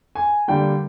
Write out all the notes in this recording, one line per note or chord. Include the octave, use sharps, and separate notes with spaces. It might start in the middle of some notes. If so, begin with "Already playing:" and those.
G#5
D3 G3 A#3 G5